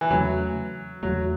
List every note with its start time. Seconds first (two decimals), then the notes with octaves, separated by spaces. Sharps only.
0.01 E3
0.10 E2 C#3 F#3 A3
1.03 E2 C#3 F#3 A3